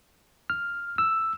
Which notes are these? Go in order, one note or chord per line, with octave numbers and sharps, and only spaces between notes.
F6
E6